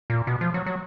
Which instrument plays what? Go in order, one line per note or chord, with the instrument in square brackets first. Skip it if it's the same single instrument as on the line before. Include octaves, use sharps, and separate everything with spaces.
[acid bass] A#2
B2
F3
F#3
F#3